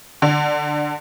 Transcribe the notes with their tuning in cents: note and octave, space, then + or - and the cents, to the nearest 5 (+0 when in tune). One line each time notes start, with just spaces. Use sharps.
D3 +10